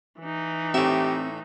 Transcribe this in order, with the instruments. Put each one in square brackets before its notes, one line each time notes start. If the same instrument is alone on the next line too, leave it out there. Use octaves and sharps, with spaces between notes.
[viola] E3 D#4
[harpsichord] A2 E5 [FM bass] C4 [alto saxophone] G4